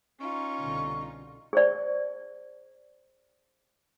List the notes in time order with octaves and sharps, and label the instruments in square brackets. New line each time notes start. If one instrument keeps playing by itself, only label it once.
[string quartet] C#4 D#4 F4 [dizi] C#6
[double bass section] C2 B2 D3
[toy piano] G#4 C5 D5